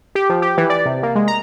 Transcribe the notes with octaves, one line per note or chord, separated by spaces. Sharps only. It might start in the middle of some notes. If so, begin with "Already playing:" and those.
G4
F3
G4
E3
D5
C3
A#3
G#3
A#5